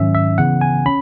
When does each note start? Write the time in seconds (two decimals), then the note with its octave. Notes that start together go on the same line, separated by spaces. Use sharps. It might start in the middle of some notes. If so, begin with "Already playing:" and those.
Already playing: G#2 D#3 F#3 C#4 E5
0.15 E5
0.38 C#3 E3 B3 F#5
0.61 G#5
0.86 C#4 B5